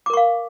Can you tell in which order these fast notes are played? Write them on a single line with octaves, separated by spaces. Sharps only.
D6 A#4 C#6 F5